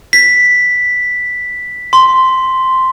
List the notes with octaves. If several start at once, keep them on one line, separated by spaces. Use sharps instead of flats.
B6
C6